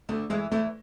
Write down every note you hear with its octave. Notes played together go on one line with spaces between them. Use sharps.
D2 D3 A3
E2 E3 G#3
E2 E3 A3